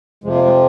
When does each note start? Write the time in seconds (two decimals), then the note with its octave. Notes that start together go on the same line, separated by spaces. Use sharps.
0.24 F2 C3 F3 G#3
0.35 A#3
0.46 G#3